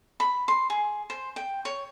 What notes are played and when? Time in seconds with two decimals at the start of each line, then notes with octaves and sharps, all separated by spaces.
0.20 B5
0.48 C6
0.70 G#4
1.10 C5
1.36 G5
1.65 C#5